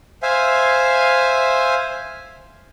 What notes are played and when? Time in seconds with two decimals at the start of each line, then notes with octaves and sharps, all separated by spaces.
0.23 C5 E5 F5 G#5